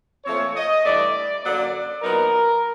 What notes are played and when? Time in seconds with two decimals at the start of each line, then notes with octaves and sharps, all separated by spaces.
0.25 A#2 F3 A3 C4 C#5
0.55 D#5
0.84 G2 E3 A3 D5
1.43 F#2 D3 F#3 A#3 D5
2.01 A#2 F#3 B3 D#4 A#4